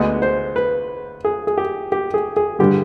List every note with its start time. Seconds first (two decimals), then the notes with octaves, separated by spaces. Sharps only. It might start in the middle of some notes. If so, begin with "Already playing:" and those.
Already playing: D2 D3 G#3 B3 D#5
0.22 C5
0.56 B4
1.25 G#4
1.47 G#4
1.58 G4
1.92 G4
2.14 G#4
2.36 G#4
2.59 G2 D3 G3 G4